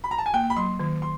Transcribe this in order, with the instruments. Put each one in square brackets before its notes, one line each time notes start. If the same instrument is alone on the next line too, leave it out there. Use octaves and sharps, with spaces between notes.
[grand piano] B5
A#5
A5
G#5
[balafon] A#3 [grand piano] G5
[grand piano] B5
[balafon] F#3 [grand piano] C6
[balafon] D#3
[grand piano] C6